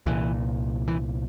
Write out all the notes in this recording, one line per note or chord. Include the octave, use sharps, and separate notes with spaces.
C2 A#2 E3
E3